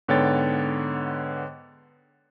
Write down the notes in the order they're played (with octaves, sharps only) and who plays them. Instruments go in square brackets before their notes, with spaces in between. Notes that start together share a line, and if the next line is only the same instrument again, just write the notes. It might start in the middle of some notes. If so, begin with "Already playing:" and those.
[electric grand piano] G#2 D3 B3 C#5 G5 A6